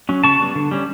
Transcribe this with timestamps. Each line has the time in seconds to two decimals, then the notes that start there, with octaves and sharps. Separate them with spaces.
0.09 F#3 C#4
0.24 C#3 A5 C#6
0.39 G3 B3
0.56 D3
0.71 G3 C#4